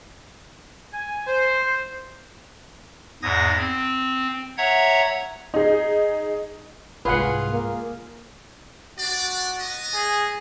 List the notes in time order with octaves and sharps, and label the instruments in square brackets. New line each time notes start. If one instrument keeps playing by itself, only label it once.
[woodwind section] G#5
C5
[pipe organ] E2 G#2 D#6 G#6 A#6
C4
C#5 E5 F#5 A#5 G#6
[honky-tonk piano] D#4 G#4
[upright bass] C2 G#2 [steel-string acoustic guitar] F4 G#4 [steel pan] B4 F#5
[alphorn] A#3
[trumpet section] D4 D5 [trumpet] F#4
[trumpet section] B3 D#5
[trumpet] G#4